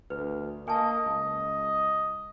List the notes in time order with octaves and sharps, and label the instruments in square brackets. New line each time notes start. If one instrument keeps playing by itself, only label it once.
[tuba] D2 [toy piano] B4
[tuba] A#3 [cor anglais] D#5 [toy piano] G#5 A5
[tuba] C#2